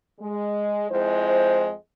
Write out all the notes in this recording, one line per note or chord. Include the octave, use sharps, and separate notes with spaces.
G#3
F2 G#3 E4 C5